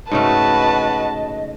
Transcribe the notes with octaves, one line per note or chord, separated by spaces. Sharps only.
G#2 C#3 A3 F#4 B4 D#5 A5